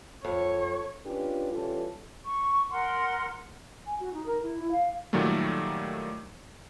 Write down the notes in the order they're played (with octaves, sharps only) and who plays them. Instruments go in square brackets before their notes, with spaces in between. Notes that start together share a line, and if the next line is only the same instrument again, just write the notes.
[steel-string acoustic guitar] F2 [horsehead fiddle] C#5
[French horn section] C#4 D4 F4 G4 B4
E3 G3 C#4 F4 A4
[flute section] C#6
A#4 F#5 C6
[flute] G#5
F#4
D#4
A#4
E4
E4
F5
[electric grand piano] A#2 D#3 F#3 G3 A3